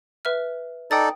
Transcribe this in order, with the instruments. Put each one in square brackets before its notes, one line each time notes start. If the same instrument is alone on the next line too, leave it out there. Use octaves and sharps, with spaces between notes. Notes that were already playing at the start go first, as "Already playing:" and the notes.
[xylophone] B4 E5 F6
[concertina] D#4 A4 D5 [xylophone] G5 D#6 A6